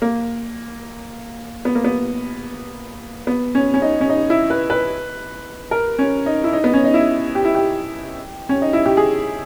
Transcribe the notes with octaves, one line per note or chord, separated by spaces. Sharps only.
A#3
B3
A#3
B3
B3
C#4
C#4
D#4
C#4
D#4
E4
B4
B4
A#4
C#4
D#4
E4
D#4
B3
C#4
D#4
E4
G4
E4
G4
C#4
D#4
E4
G4
G#4